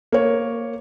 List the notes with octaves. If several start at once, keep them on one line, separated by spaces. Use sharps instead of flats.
A#3 C#5